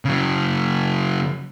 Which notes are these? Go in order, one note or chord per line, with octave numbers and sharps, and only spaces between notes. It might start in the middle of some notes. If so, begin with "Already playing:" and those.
C#3 F#3